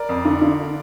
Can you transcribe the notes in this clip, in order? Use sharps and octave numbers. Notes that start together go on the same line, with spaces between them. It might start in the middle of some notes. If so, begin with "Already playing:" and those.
Already playing: A#4 D5
F2
D3
D3